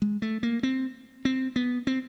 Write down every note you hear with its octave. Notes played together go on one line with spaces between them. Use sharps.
G#3
A3
A#3
C4
C4
B3
C4